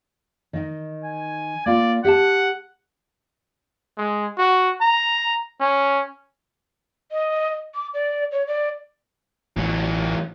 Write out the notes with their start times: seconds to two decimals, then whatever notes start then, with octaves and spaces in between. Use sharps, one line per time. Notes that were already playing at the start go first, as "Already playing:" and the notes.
0.53 D#3 D#4
1.04 G#5
1.66 A#3 F4 D5
2.04 G4 F5 F#5 A5
3.98 G#3
4.38 F#4
4.81 A#5
5.60 C#4
7.11 D#5
7.75 D6
7.94 D5
8.32 C#5
8.47 D5
9.57 A1 E3 F#3